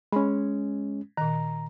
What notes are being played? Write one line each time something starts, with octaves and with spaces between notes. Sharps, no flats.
G#3 C#4 B5
A#2 D#3 A#5